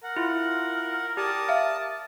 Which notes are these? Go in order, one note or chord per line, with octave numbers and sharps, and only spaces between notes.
A#4 F#5
E4 F4
G4 D5 A5 D#6
E5 F5